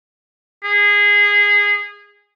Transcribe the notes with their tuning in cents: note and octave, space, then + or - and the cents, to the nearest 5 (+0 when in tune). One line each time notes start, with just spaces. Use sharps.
G#4 -20